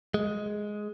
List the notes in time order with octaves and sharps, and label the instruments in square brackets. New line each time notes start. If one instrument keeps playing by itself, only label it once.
[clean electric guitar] G#3